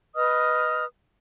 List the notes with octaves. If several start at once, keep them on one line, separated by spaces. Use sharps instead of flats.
B4 D#5 D#6 F6